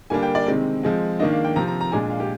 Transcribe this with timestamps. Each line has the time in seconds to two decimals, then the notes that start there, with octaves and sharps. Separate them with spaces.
0.10 D3 G3 A#3 D4 G#5
0.23 G5
0.35 D5
0.47 C3 D#3 G#3 C4
0.83 F3 G#3 C4
1.19 D#3 A#3 D4 D#5
1.32 F5
1.45 G5
1.56 C3 F3 C4 A#5
1.68 A#5
1.81 A#5
1.92 A#2 G#3 D4 G#5
2.10 F5
2.20 G4